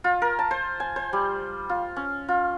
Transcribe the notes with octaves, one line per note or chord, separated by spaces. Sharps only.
F4
A#4
A5
C5
G#5
C5
G3
F4
C#4
F4